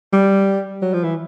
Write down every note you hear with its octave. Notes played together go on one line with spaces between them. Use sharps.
G3
F#3
F3
E3